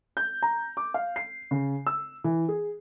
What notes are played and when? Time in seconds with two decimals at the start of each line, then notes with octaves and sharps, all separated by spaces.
0.17 G6
0.42 A#5
0.77 D6
0.94 F5
1.16 C7
1.51 C#3
1.87 E6
2.24 E3
2.49 G#4